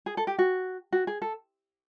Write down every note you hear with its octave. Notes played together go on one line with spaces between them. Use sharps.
G#4
A4
G4
F#4
F#4
G#4
A4